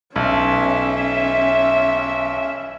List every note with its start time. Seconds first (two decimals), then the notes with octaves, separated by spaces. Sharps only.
0.16 B1 C#4 E5